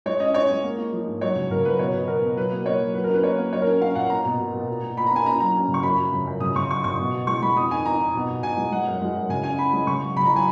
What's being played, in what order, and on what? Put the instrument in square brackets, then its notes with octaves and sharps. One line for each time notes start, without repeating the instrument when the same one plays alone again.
[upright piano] G#3 C#5
C#4 D#5
C#4 C#5
G#3
A#3
A#3
F3
G#2
F#3 C#5
C#3
C#3 A#4
F#3 B4
B2 C#5
B2 B4
B3 A#4
B2
F#3 B4
A#3
A#3 C#5
F#3
F#3 B4
A#4
C#4 B4
A#3 C#5
A#3
F#3 C#5
A#4
C#4
C#4 F5
A#2 F#5
A#3 A#5
B2
B2
B2
A#2
A#2
A#2 B5
A#5
A#3 G#5
C#4 A#5
F#3 A#5
C#4
C#3
C#6
F#2 B5
F3
C#3
F#2
C#3 D#6
C#3 C#6
F#3 C#6
C#3 C#6
B2
B2
G#3 C#6
G#3 B5
F2 D#6
D#3 G#5
F2 A#5
D#3
B2
B2
B2 G#5
G#3
G#3 F#5
F#2
G#3
F#2
C#3 G#5
C#4 G#5
C#4 B5
G#3
C#3 C#6
F#3
C#3 B5
A#5
F#3 G#5